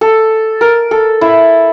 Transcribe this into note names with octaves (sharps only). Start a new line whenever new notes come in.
A4
A#4
A4
E4